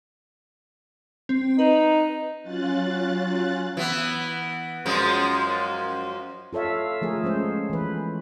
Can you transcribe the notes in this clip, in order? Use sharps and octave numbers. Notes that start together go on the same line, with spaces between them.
C4
D#4 B4
F#3 C#4 F4 F#6 A6
E3 B3
F#2 F3 G#3
F4 A4 C#5 E5 F5
F3 A3 G#4 A#4
G#3 C#4 G#4 C5
E3 B4